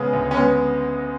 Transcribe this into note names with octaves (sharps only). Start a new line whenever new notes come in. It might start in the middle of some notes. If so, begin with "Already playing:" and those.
Already playing: C#3 G#3 B3
D2
C#4
G#3 B3